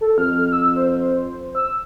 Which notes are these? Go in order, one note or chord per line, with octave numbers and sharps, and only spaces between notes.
A4
F2 F6
E6
C5
E6